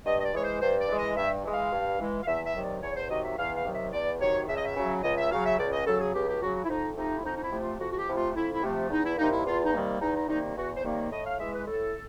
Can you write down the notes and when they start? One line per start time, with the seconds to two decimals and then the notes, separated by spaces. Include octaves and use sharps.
0.06 G2 D#5
0.19 D#5
0.24 D5
0.34 E3 G#3 C#5
0.43 C5
0.61 G2 C5
0.80 D5
0.89 E3 G#3
0.99 D#5
1.17 G2 E5
1.45 E3 G#3
1.53 F5
1.72 G2
2.00 E3 G#3
2.23 F5
2.27 E2 E5
2.46 E5
2.55 C3 D#3 F#3
2.64 D5
2.82 E2 C#5
2.96 C5
3.10 C3 D#3 F#3 D#5
3.24 E5
3.38 E2 F5
3.56 F5
3.65 C3 D#3 F#3
3.75 E5
3.93 E2 D5
4.20 C3 D#3 F#3 C#5
4.48 C#2 E5
4.56 D#5
4.65 E5
4.76 C#3 F#3
5.03 C#2 D#5
5.17 E5
5.31 C#3 F#3 F5
5.45 E5
5.59 C#2 D5
5.73 D#5
5.87 C#3 F#3 A4
6.00 G#4
6.14 C#2 G4
6.28 G4
6.41 C#3 F#3 F#4
6.56 F#4
6.65 E4
6.69 F2 D#4
6.97 C3 F3 A3 D#4
7.17 E4
7.25 F2 D#4
7.36 D#4
7.43 E4
7.52 C3 F3 A3
7.61 F4
7.80 F2 F#4
7.91 F#4
7.98 G4
8.08 C3 F3 A3 E4
8.17 F4
8.35 F2 E4
8.54 E4
8.63 C3 F3 A3
8.90 E2 D#4
9.05 E4
9.18 C3 D#3 G3 A#3 D#4
9.32 E4
9.46 E2 F4
9.64 D#4
9.73 C3 D#3 G3 A#3
10.01 E2 D#4
10.15 D#4
10.29 C3 D#3 G3 A#3 D#4
10.56 E2 F#4
10.75 C5
10.84 C3 D#3 G3 A#3
10.93 C#5
11.11 A2 D#5
11.26 F5
11.39 E3 G#3 E5
11.53 B4
11.67 A2 A4